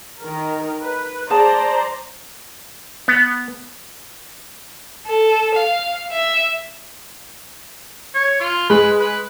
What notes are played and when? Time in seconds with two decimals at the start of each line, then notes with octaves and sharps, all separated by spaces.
0.21 D#3 A#4
0.81 B4
1.30 G#4 C5 D5 A5 A#5
3.08 B3
5.06 A4
5.55 F5
6.13 E5
8.15 C#5
8.40 F4
8.70 G#3 B4
9.00 B4